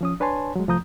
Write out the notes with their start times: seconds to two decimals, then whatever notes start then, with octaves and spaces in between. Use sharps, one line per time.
0.01 F3 C#4 D#6
0.20 D4 B4 C#5 G#5 A5 C6
0.56 F#3 G#3
0.68 C2 F3 A3 A#5 D#6 G6